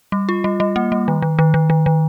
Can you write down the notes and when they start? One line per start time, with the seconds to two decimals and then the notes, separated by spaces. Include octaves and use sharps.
0.12 G3
0.29 F4
0.44 G3
0.60 G3
0.76 A#3
0.92 G3
1.08 D#3
1.22 D#3
1.39 D#3
1.54 D#3
1.70 D#3
1.86 D#3